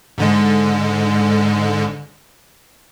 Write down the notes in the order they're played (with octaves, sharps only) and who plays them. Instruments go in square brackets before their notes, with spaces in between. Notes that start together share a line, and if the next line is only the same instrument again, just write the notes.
[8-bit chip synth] G#2 D3 G#3